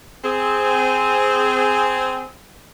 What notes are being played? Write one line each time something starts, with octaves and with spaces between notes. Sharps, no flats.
C4 G#4